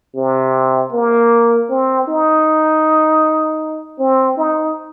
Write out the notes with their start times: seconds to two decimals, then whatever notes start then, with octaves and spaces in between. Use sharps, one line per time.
0.16 C3
0.93 A#3
1.70 C4
2.08 D#4
3.99 C4
4.38 D#4